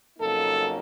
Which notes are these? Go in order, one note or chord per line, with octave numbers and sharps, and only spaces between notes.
F2 C#3 F#3 A#3 D#4 A4